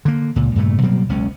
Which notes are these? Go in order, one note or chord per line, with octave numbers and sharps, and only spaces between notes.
D3 A#3
C#2 A#2
G2 A#2 C#3 A3
B2 F#3 G3 A#3
F#1 C#2 C#4